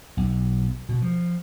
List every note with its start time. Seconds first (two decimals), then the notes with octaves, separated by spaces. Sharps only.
0.17 B1
0.89 B2
1.02 F3